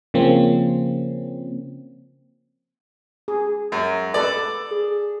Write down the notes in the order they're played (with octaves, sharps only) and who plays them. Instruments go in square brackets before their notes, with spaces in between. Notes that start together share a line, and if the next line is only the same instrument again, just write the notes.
[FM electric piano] C#3 F3 A#3 C4 C#4
[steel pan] G#4
[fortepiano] F#2
[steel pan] A4 B4 [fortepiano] D5
[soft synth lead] G#4